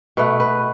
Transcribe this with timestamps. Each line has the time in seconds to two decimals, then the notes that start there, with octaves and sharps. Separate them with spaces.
0.17 B2 A3 B4
0.40 B4